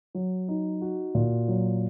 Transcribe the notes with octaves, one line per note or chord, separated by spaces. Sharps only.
F#3
D#4
F#4
A#2
F#3